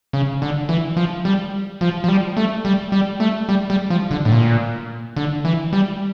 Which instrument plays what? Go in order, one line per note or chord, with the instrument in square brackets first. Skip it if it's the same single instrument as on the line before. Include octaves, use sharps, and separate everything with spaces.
[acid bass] C#3
D3
E3
F3
G3
F3
F3
G3
A3
G3
G3
A3
G3
G3
F3
D3
A2
A#2
D3
E3
G3